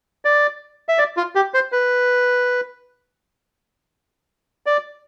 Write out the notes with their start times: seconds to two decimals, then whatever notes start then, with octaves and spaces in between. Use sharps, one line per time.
0.25 D5
0.89 E5
0.98 D5
1.17 F4
1.35 G4
1.54 C5
1.72 B4
4.66 D5